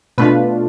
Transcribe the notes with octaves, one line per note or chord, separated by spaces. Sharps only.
B2 A3 D4 F4 B4